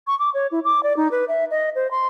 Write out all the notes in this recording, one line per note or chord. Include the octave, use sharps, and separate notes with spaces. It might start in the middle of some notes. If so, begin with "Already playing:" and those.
C#6
D6
C#5
E4
D6
D5
D#4
B4
E5
D#5
C5
C6